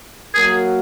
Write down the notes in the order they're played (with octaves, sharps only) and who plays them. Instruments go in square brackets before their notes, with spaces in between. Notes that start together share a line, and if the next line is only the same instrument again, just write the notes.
[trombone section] F#3 A#3 F#4 A#4 [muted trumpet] G#4